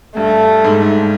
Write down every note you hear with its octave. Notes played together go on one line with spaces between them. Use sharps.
G2 A3
G#2